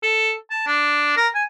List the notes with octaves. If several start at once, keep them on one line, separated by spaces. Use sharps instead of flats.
A4
A5
D4
A#4
G#5